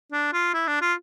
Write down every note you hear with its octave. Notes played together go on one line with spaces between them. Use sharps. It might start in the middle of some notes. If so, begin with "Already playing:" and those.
D4
F4
E4
D4
F4